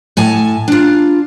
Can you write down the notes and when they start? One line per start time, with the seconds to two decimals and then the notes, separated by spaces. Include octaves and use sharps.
0.17 A2 G#5 A5
0.68 D4 F4